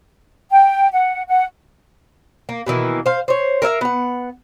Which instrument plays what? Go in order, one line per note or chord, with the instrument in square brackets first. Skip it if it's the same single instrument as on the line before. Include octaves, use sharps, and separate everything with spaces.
[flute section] G5
F#5
F#5
[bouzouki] A#3
B2 D#3 E3 A#3
C5 F5
C5 C#5
A#4 C#5 E5 F5
B3 F#5